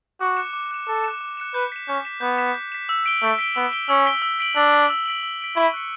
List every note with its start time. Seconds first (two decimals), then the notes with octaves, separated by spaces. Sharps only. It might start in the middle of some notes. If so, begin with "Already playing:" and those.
0.20 F#4 D6
0.37 F#6 C#7 E7
0.53 D6
0.71 F#6 C#7 E7
0.87 A4 D6
1.04 F#6 C#7 E7
1.21 D6
1.37 F#6 C#7 E7
1.54 B4 G6
1.72 B6 E7
1.88 C#4 G6
2.05 B6 E7
2.21 B3 G6
2.38 B6 E7
2.54 G6
2.72 B6 E7
2.89 E6
3.05 B6 D7 G7
3.22 A3 E6
3.38 B6 D7 G7
3.55 B3 E6
3.72 B6 D7 G7
3.89 C#4 E6
4.06 B6 D7 G7
4.22 E6
4.39 B6 D7 F#7
4.56 D4 E6
4.73 B6 D7 F#7
4.89 E6
5.06 B6 D7 F#7
5.23 E6
5.39 B6 D7 F#7
5.56 E4 C#6
5.74 F#6 C#7